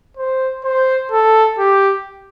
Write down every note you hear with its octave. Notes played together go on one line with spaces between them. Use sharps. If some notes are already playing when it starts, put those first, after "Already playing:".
C5
C5
A4
G4